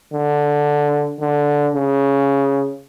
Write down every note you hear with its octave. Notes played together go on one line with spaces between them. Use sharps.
D3
D3
C#3